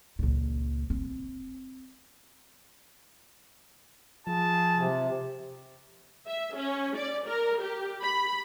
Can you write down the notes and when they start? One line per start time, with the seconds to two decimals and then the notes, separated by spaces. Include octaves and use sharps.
0.19 C#2 A#2
0.90 C4
4.27 F3 F4 G#4 A5
4.75 C3
6.27 E5
6.56 C#4
6.96 D5
7.26 A#4
7.61 G4
8.02 B5